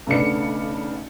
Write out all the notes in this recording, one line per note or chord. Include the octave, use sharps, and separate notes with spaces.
B1 C#3 A3 B3 D4 C#7